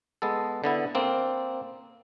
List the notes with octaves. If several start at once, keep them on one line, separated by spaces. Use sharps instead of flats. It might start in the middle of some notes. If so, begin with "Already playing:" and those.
G#3 B3 A4
D3 B3 E4
A#3 C4